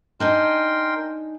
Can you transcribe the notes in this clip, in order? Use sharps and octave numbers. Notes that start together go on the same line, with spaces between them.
D4 D#4 A#4 G5 G#5 C6